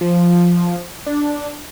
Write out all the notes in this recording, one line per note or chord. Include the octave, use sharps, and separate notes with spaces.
F3
D4